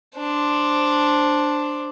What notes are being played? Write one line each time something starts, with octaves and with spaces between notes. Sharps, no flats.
D4 C5